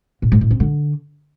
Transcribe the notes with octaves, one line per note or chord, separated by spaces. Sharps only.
A#2
G#2
A2
C4
D3